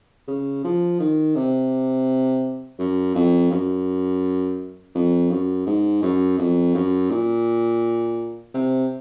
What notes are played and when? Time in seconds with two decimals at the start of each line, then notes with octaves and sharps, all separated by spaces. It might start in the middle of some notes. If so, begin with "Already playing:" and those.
0.28 C#3
0.64 F3
1.00 D#3
1.35 C3
2.79 F#2
3.15 F2
3.51 F#2
4.94 F2
5.30 F#2
5.66 G#2
6.02 F#2
6.38 F2
6.74 F#2
7.10 A#2
8.54 C3